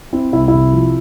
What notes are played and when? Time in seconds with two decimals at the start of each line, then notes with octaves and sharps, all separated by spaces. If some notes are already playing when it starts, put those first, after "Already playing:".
0.13 C4 E4
0.33 C2 E4
0.48 E4
0.54 C3
0.73 F3